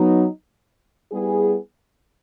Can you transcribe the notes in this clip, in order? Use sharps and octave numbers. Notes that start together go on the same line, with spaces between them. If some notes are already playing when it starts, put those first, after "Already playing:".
Already playing: F#3 B3 D#4
G3 B3 E4 G#4